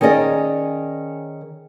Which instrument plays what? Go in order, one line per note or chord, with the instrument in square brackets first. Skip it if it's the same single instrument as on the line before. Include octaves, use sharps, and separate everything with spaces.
[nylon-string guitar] D#3 C#4 G#4 D5 D#5